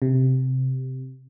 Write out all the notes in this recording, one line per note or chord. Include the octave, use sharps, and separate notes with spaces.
C3